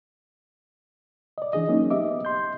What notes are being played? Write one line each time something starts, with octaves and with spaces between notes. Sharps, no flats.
D5 D#5
E3 D4 G#4 D#5
F#3 A#3 C#4 D#4
B3 G4 D#5 E5 D6
C6 G6